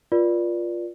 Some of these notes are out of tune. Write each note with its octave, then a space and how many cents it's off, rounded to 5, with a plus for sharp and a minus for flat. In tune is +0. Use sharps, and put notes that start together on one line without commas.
F4 +0 B4 -45 D5 +0